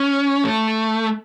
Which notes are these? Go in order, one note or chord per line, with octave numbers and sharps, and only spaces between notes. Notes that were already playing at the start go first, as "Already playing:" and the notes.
Already playing: C#4
A3